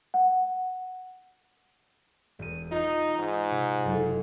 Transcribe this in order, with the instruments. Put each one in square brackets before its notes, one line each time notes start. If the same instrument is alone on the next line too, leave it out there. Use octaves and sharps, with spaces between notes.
[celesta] F#5
[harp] E1 D#7
[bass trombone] D#4 [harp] F4
[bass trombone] G#2
[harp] C3
F#1 F#3 A4